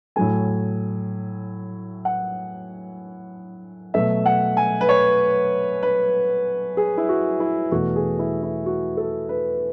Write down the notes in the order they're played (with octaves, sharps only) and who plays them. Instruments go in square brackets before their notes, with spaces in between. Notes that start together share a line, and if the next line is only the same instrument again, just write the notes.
[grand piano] A2 F#3 A3 G#5
F#5
B2 F#3 A3 E5
F#5
G#5
B4
C#5
B4
G#4
E4
F#4
E4
E2 B2 A3 F#4
G#4
E4
E4
F#4
A4
B4